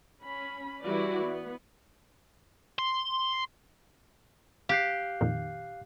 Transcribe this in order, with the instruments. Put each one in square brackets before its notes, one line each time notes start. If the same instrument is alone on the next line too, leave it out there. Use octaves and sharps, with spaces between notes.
[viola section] C#4 B5
E3 G3 E4 F#4 B4 D5
B3
[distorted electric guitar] C6
[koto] G4 [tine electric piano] F5 F#6 C7
[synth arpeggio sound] F2 A#2 D#3